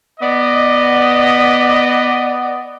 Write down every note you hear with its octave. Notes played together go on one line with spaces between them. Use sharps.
B3 D5 D#5